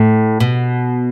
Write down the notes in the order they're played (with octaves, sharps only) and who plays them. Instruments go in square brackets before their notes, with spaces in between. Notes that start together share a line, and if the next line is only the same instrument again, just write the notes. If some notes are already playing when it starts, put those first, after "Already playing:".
Already playing: [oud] A2
B2